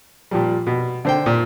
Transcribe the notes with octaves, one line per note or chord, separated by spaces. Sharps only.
A#2 F3 G3
B2
D3 C5 G5
A#2